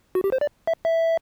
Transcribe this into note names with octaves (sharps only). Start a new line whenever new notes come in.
F#4
G4
C5
D5
E5
E5